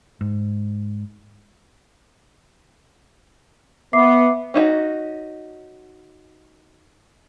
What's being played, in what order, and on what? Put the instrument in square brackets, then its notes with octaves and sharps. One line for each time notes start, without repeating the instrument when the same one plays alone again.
[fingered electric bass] G#2
[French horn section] B3 [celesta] E5 D6 C7
[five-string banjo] C#4 D#4 E4 F#4